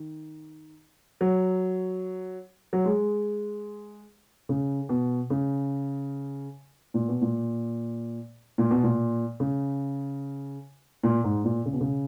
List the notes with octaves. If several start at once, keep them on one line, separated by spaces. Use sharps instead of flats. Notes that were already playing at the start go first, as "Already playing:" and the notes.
Already playing: D#3
F#3
F#3
G#3
C#3
B2
C#3
A#2
B2
A#2
A#2
B2
A#2
C#3
A#2
G#2
A#2
C#3
B2
C#3